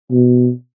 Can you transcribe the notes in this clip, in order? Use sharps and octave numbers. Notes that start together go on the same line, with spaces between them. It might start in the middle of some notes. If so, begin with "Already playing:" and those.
B2